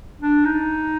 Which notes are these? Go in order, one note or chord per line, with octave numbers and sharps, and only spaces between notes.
D4
D#4